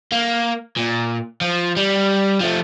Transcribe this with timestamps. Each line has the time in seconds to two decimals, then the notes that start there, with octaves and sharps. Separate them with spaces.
0.12 A#3
0.77 A#2
1.41 F3
1.76 G3
2.41 F3 A3